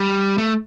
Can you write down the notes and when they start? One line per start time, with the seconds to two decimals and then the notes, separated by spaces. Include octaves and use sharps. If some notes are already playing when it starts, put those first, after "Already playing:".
Already playing: G3
0.38 A3